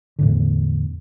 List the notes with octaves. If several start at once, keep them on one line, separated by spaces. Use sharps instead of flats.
E2 A2 D3